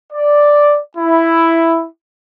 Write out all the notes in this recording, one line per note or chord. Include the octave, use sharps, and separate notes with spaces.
D5
E4